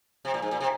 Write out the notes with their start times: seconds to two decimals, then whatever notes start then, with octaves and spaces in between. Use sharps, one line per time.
0.25 C3
0.34 A#2
0.42 G#2
0.51 A#2
0.60 C3